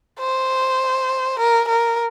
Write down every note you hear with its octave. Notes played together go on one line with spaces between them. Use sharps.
C5
A#4
A#4